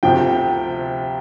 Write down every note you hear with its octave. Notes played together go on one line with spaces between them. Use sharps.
D2 C3 F3 G5